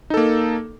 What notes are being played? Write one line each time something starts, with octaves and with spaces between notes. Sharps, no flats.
A#3 D#4 A4